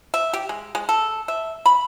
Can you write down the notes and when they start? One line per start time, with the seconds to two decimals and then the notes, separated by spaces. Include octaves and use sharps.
0.14 E5
0.33 G4
0.49 G#3
0.75 G#3
0.89 A4
1.28 E5
1.66 B5